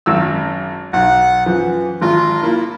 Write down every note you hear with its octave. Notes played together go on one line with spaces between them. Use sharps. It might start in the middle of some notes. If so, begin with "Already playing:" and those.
G#1 F#2 E6
B1 F#5
F#2 E3 F3
G#1 F4
A#3 E4